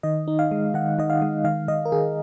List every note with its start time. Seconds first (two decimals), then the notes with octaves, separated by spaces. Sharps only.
0.03 D#3 D#5
0.28 D#4
0.39 F5
0.51 G#3
0.74 D#3 F#5
0.99 D#3 D#5
1.10 F5
1.22 G#3
1.44 D#3 F5
1.68 D#3 D#5
1.85 A#4
1.92 D#3 G#4